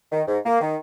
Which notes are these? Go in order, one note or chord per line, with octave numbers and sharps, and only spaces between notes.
D#3
G#2
A#3
D#3